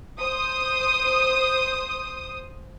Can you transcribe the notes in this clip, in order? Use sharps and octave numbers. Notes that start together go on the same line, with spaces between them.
C5 D#6